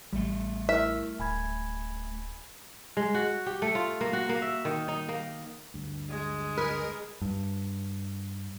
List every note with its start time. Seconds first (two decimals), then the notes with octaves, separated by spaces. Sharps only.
0.13 A1 G3 A3
0.69 E4 A#4 E5 F6
1.20 D1 G#5 B5 G#6
2.97 G#3
3.14 F#4
3.46 G4
3.62 A3
3.75 F4
4.01 A#3
4.13 F#4
4.29 A#3
4.42 E5
4.65 D#3
4.88 D#4
5.09 A#3
5.74 D2 G2
6.09 G#3
6.58 A#4 B4
7.21 G2